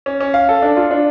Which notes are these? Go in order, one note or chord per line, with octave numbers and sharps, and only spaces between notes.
C#4
C#4
F5
A4
D4
F4
D4